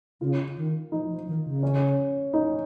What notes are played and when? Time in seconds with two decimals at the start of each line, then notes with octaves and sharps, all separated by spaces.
0.21 C#3 F4
0.57 D#3
0.92 F3 D#4
1.10 F3
1.27 D#3
1.45 C#3
1.63 C#4
2.33 D#4